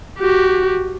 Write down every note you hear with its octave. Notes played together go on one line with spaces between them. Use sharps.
F#4 G4